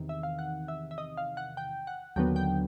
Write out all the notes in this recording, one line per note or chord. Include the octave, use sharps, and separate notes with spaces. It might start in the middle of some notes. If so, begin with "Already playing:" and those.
Already playing: E2 C3 D#3
E5
F5
F#5
E5
E5
D#5
F5
F#5
G5
F#5
D#2 D3 F#3 B3 G5
G5